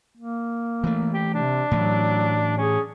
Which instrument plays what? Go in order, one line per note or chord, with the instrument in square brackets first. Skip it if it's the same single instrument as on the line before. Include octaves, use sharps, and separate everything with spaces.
[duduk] A#3
[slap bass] E3 A3
[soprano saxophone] G4
[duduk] C3 [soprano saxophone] D4
[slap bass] A2 E3 [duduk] F#3
[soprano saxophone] C#4 [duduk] G#4